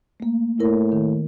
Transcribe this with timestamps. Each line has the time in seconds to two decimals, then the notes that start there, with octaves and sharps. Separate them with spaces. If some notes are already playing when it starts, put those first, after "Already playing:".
0.20 A3 A#3
0.60 A2 E4 A#4
0.92 D#3